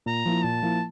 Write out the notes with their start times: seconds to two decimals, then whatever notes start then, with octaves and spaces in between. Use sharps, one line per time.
0.06 A#2 A#5
0.26 F3 A#3 E4
0.44 A#2 A5
0.62 F3 A#3 E4